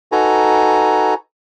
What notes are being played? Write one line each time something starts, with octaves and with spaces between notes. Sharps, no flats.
D#4 F#4 A4 B4 G#5 A#5